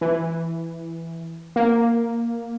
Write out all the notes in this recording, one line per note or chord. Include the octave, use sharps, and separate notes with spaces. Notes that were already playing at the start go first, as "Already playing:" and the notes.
E3
A#3